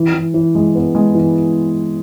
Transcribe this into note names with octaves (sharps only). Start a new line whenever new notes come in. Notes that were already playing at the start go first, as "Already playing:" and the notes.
Already playing: E3
E3
E3
G#3
B3
G#3
E3